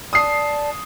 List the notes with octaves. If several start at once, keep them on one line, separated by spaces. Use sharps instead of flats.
D5 A5 D#6 C7